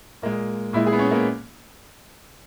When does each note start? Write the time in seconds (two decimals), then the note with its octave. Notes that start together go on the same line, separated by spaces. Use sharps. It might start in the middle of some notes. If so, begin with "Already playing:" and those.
0.22 A#2 G#3 A#3
0.73 A#2 G#3 E4
0.87 G#4
0.93 B3
0.99 C#4
1.11 A#3